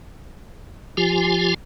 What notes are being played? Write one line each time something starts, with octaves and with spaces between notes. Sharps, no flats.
F3 F4 G4 G#5